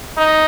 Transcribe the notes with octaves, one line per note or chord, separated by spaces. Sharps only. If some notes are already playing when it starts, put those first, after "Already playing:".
D#4